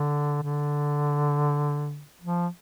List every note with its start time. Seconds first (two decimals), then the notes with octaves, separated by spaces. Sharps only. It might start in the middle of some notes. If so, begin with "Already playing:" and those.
Already playing: D3
0.43 D3
2.22 F3